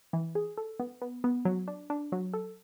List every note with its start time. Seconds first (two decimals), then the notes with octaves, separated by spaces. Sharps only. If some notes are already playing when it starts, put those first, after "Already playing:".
0.13 E3
0.35 G#4
0.58 A4
0.80 B3
1.02 B3
1.24 B3
1.45 F#3
1.68 D4
1.90 D4
2.12 F#3
2.33 A4